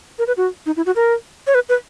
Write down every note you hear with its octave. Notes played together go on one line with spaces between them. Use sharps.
A#4
B4
F#4
D#4
E4
F#4
A#4
C#5
B4
B4